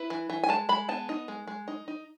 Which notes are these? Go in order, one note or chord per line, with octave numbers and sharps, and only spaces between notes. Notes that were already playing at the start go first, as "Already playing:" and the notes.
Already playing: E4 B4
E3
E3
G#5
G#3 A5
G#3 B5
B3 A5
D#4
G#3
G#3
D#4
D#4